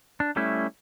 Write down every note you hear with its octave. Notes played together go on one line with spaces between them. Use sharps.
D4
G3 A3 C#4 E4